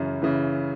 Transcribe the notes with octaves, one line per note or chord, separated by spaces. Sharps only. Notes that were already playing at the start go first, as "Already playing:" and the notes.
Already playing: F#2 C#3 E3
C#3 E3